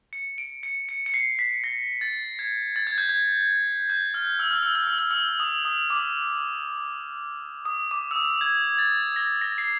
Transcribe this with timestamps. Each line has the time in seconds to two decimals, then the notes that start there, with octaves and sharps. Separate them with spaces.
0.13 C#7
0.38 D7
0.63 C#7
0.89 C#7
1.06 C#7
1.14 C7
1.39 B6
1.64 A#6
2.01 A6
2.39 G#6
2.76 A6
2.87 G#6
2.98 G6
3.09 G#6
3.90 G6
4.14 F6
4.39 E6
4.51 F6
4.63 E6
4.75 F6
4.87 E6
4.98 F6
5.11 E6
5.40 D#6
5.65 D#6
5.90 D6
7.65 D#6
7.91 D6
8.11 E6
8.16 D#6
8.41 G#6
8.79 A6
9.16 A#6
9.41 A#6
9.58 C7